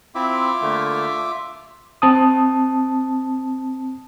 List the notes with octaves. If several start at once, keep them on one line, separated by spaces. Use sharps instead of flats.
C4 E4 F4 E5 D6
D3 A3 A#3
C4 A5 D#6